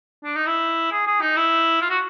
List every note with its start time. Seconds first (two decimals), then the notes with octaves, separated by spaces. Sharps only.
0.24 D4
0.36 D#4
0.46 E4
0.92 G#4
1.07 G#4
1.21 D#4
1.36 E4
1.81 F4
1.90 F#4